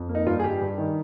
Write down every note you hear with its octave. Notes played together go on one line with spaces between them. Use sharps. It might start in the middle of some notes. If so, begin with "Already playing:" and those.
Already playing: F2
A#3
D#4
G2 F4
G#4
G2 G4
G2
D#3